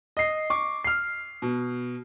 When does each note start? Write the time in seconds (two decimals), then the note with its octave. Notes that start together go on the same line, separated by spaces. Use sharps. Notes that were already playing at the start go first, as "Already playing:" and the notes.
0.17 D#5 C7
0.50 C#6 D6
0.84 F6 C7
1.42 B2